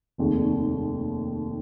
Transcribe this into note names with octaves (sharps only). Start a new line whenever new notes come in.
F1 D#2 D#3 G#3